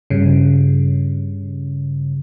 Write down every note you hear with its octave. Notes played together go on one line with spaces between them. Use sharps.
G2 C#3